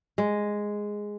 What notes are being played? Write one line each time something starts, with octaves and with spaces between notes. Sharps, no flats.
G#3